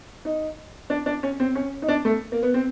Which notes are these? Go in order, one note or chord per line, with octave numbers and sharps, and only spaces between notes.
D#4
D4
D4
C#4
C4
C#4
D#4
D4
A3
A#3
B3
C4